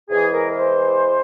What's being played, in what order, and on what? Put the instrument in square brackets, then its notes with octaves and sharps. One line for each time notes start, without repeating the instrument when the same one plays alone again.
[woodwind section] E2 C3 E3 G#3 G#4
A#4
C5